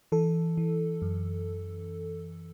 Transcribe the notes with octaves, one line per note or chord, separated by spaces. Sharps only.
E3 A4
E3
F#2